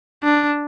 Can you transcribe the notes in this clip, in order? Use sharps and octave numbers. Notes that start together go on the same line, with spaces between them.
D4